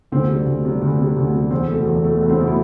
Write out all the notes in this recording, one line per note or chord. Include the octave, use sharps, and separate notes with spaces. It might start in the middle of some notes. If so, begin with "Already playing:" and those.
D2 C4
C3 G3
D2
C3 G3
D2 B3
C3 G3
D2
C3 G3
E2 C4
B2 A3
E2
B2 A3
E2 B3
C4
B2 A3
E4